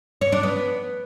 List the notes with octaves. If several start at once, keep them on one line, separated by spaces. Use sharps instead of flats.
C#5
D4
B3